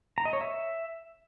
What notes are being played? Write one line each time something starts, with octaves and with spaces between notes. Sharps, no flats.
A#5
D#5
C#5
E5